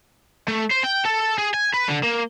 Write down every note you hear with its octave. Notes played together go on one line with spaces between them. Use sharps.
A3
C5
G5
A4
G#4
G#5
B4
D3
A#3